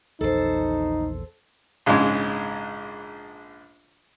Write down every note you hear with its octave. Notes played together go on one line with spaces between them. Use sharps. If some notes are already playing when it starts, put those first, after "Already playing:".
A#1 E2 D#3 D#4 A4 C5
A#1 G#2 C#3 G#3